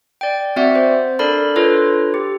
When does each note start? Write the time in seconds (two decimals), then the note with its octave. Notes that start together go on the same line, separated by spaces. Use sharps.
0.21 D5 G5
0.56 C4 F#4 D5 E5 F#5
0.75 C5
1.19 D4 A4 A#4 D5 B5
1.56 D4 F4 A4 B4 C#5
2.14 G4